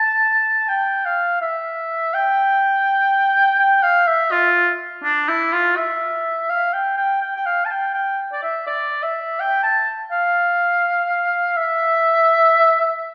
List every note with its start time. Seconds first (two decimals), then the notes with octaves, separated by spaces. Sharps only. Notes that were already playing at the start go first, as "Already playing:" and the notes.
Already playing: A5
0.68 G5
1.05 F5
1.41 E5
2.14 G5
3.59 G5
3.83 F5
4.07 E5
4.31 F4
5.03 D4
5.28 E4
5.53 F4
5.77 E5
6.50 F5
6.73 G5
6.97 G5
7.21 G5
7.36 G5
7.46 F5
7.65 A5
7.70 G5
7.94 G5
8.32 D5
8.43 E5
8.67 D5
9.03 E5
9.40 G5
9.63 A5
10.11 F5
11.57 E5